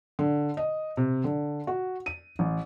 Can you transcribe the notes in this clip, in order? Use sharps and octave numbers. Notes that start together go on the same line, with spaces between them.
D3
D#5
C3
D3
F#4
D#7
A1